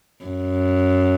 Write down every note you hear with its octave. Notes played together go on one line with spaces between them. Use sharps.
F#2